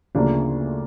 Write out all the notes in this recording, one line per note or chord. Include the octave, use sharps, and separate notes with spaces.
D2 C#3 F3 A#3 D4